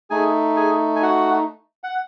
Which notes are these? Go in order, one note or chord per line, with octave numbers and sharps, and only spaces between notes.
A3 D#4 G#4 G#5
G#4 G#5
G#5
F#4 F#5
F#5